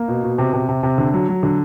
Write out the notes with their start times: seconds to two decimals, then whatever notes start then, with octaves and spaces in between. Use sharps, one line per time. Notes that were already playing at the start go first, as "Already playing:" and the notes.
Already playing: A#3
0.08 B2
0.23 B2
0.38 C3
0.53 C3
0.68 C3
0.83 C3
0.98 D3
1.13 F#3
1.29 F#3
1.43 D3